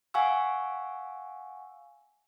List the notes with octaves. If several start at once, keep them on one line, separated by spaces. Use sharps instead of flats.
F5 F#5 G#5 C#6 E6